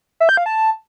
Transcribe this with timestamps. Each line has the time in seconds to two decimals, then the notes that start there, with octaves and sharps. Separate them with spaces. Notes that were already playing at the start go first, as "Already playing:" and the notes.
0.20 E5
0.29 G6
0.37 F5
0.46 A5